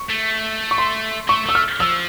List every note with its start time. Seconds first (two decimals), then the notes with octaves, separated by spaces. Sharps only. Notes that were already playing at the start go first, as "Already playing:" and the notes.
Already playing: C#6
0.10 A3
0.71 C#6
0.78 C6
1.29 A3 C#6
1.46 A3 E6
1.55 F6
1.80 F3 E6